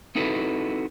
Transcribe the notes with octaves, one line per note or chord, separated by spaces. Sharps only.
C4 D#4 E4 F#4 A4 B4